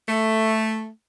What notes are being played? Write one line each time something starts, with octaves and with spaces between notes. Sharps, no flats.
A3